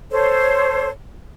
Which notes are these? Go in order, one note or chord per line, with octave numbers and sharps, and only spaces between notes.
A4 C5 C#5